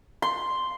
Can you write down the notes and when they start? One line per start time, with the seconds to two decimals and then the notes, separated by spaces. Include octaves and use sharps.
0.22 C6